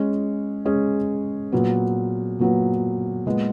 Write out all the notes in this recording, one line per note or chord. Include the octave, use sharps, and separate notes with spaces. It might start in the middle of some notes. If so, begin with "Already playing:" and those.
Already playing: G#3 C#4 G#4
G#3 C#4 G#4
A#2 F#3 B3
A#2 F#3 B3
A#2 G#3 B3